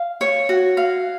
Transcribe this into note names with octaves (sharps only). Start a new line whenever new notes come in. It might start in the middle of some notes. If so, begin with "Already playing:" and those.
Already playing: F5
C#5
F#4
F5